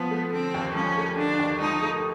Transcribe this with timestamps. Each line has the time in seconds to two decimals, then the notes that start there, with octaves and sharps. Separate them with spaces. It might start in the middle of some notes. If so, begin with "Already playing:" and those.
Already playing: F3 B3
0.11 A3
0.33 D3 C4
0.54 D#2
0.75 F3 C#4
0.97 A3
1.18 D3 D4
1.39 D#2
1.61 F3 D#4
1.82 A3